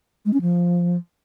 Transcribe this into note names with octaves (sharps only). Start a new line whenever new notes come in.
G#3
C#4
F3